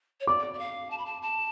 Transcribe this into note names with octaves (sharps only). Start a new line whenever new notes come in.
C#5
D5 D6
D5
F5
A5
B5
A5
A5